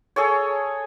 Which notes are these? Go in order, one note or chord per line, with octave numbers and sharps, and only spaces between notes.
G#4 A4 C#5